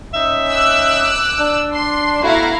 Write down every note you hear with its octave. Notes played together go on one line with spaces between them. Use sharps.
C#4 D#4 E5
D6 E6 F#6
D4
C6
B2 A3 E4 F#4 F5 A#5